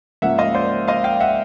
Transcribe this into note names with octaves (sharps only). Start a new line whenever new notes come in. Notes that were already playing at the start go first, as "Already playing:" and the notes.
G#2 F3 A#3 C#4 E5 F#5
D#5 F5
C5 D5
D#5 F5
F5 G5
E5 F#5